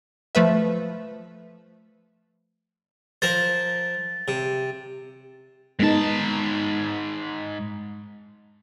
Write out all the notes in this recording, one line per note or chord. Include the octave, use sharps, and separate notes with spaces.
F3 A3 B4 E5
F3 A#4 C5 A6
C3
G#2 G#3 B3 D#4 A5